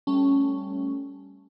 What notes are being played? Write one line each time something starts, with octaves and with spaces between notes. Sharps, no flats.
G3 A3 C#4